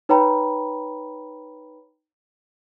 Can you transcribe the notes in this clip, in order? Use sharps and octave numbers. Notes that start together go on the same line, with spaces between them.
D#4 B4 C#5 G5 A#5 B5